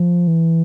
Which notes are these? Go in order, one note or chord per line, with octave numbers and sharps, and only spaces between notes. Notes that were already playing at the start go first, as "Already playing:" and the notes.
Already playing: F3
E3